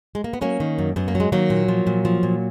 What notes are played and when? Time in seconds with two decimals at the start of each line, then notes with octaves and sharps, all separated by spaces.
0.15 G#3
0.24 A#3
0.33 B3
0.41 F#3 A#3 C#4
0.60 D#3
0.78 F#2
0.96 F#2 B3
1.08 A#3
1.15 F#3
1.20 G#3
1.32 D#3 F#3 A#3
1.50 A#2
1.68 F3
1.87 A#2
2.05 F3
2.23 A#2